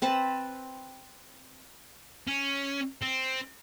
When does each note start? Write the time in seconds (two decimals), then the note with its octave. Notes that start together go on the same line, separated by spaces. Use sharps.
0.02 C4 B4 A5 B5
2.27 C#4
3.02 C4